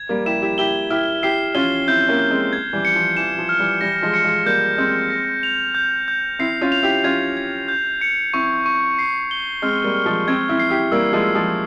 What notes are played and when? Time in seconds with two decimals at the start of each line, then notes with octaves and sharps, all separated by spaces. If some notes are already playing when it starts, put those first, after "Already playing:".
Already playing: G#6
0.09 G3 A#3
0.26 E4 G4 E7
0.42 E4 G4
0.58 E4 G4 G7
0.90 E4 G4 F6
1.22 E4 G4 C7
1.55 C#4 F4 G7
1.87 C4 E4 G6
2.08 A#3 C#4
2.19 G6
2.30 G#3 C4
2.53 G#6
2.73 E3 G3
2.85 C#7
2.95 F3
3.17 E3 E7
3.38 F3
3.49 F6
3.59 E3 G3
3.81 E3 G3 A#6
4.02 F3 G#3
4.14 C#7
4.24 F3 G#3
4.46 G3 A#3 G6
4.78 G#3 C4 G6
5.10 A#6
5.43 F7
5.75 G6
6.08 G6
6.39 C4 E4 C7
6.61 C#4 F4
6.72 F7
6.83 E4 G4
7.04 C#4 F4 G#6
7.37 G#6
7.68 G6
8.01 C#7
8.34 C4 E4 C#6
8.66 C#6
8.99 C7
9.31 G7
9.62 G#3 C4 F6
9.84 G3 A#3
9.95 F6
10.05 F3 G#3
10.27 G#3 C4 G#6
10.49 C4 E4
10.59 C7
10.70 E4 G4
10.92 G3 A#3 E6
11.13 F3 G#3
11.24 E6
11.35 F3 G#3